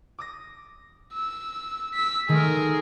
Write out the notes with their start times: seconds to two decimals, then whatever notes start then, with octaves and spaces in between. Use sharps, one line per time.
0.18 D6 D#6 A#6
1.14 E6
1.93 E6 B6
2.29 D#3 G#3 A3 G#4 A#4